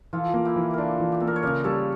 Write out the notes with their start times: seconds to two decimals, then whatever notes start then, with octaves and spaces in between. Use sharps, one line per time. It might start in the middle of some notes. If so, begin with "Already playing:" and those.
0.13 E3 F4 A4
0.34 A#3
0.45 E4 G4
0.56 E3
0.74 D4 F4 A4 A#4
1.00 E3
1.12 G4
1.20 A#3 A4
1.27 A#4
1.36 C#5
1.42 C#3 A#4 D5
1.64 G3 A4 C#5